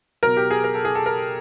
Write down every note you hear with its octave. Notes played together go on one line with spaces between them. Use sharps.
B2 F#3 A#4
G4
G#4
A#4
A4
G#4
A4
A#4